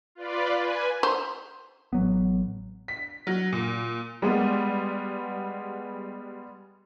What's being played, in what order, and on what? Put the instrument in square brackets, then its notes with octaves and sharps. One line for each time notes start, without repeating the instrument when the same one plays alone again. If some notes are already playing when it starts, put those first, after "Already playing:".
[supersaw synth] F4 B4 D5
B4 G#5
[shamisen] C5
[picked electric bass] A1 F#3 B3
[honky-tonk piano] B6
F#3
A#2
G3 G#3 B3